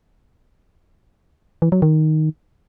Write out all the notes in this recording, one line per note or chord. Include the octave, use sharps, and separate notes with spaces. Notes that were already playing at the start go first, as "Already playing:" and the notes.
E3
F#3
D#3